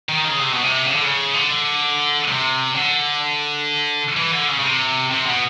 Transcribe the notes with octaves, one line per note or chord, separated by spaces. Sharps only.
D#3
C#3
C3
B2
C3
C#3
D3
C#3
D3
C3
D3
E3
D3
C#3
C#3
C3
C3
B2